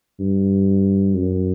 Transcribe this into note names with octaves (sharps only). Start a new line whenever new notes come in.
G2
F#2